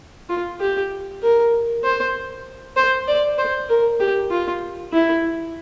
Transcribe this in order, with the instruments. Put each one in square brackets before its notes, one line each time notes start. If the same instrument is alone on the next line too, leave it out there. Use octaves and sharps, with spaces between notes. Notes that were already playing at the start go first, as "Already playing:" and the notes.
[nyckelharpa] F4
G4
A#4
C5
C5
D5
C5
A#4
G4
F4
E4